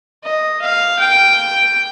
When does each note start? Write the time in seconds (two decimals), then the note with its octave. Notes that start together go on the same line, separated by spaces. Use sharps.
0.24 D#5
0.61 F5
0.99 G5